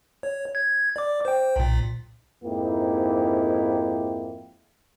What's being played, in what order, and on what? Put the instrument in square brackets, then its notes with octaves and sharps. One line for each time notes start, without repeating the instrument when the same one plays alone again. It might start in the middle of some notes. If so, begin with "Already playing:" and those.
[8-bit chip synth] C#5
G#6
D5 D6
C5 G5
B1 A#2
[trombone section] F2 G#2 A#3 D#4 E4 G4